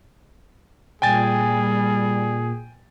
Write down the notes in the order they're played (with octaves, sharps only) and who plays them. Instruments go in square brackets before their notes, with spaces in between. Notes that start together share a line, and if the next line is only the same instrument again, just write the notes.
[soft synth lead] A#2 [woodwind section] G3 [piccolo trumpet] G#4 [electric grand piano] G5 G#5 A6